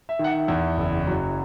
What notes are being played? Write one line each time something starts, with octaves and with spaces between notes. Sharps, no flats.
E5
D#3
F#5
E5
E2
F#1
F#3